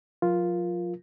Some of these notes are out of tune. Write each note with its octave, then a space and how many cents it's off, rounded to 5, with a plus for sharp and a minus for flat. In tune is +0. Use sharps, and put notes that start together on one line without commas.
F3 +45 F4 +0 A#4 +25